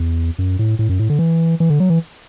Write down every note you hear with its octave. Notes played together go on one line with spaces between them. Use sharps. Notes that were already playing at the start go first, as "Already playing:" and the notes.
Already playing: E2
F#2
A2
A2
F#2
A2
D3
E3
E3
D3
F#3
E3